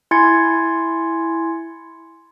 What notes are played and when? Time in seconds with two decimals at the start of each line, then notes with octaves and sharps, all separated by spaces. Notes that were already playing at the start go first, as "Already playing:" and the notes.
0.11 E4 G#5 C6 G#6 A6 C#7